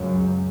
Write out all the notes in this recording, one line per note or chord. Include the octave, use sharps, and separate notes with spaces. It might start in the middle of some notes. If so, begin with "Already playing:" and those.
Already playing: C#2 F#2 C#3 F#3